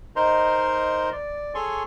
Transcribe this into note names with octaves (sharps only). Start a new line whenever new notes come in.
D#4 A#4 C5 D#5 A#5 C6
D5
G#4 A4 C#5 G#5 C6 C#6